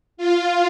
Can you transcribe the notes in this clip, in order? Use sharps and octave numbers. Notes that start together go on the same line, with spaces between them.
F4